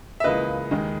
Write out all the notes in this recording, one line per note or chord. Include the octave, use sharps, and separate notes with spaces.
E5
C#2 C#3 E3 A#3 B4 D#5
D#2 D#3 G#3